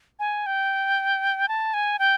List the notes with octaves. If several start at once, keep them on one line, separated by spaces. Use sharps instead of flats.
G#5
G5
A5
G#5
G5